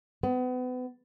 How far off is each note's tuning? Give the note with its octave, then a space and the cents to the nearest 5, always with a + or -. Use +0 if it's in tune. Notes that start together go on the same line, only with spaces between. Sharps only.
B3 +35